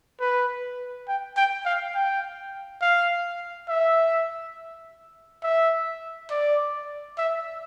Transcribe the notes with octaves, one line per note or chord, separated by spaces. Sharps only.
B4
G5
G5
F5
G5
F5
E5
E5
D5
E5